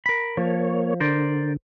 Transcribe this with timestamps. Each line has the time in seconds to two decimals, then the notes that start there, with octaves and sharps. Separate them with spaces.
0.06 A#4 B5
0.37 F3 A#3 C#5
1.00 D3 A#4 C5 D5